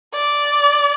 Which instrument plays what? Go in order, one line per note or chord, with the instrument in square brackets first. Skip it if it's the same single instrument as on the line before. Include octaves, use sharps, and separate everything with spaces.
[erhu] D5